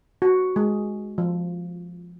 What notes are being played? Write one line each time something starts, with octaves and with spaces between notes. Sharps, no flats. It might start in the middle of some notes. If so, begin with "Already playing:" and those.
F#4
G#3
F3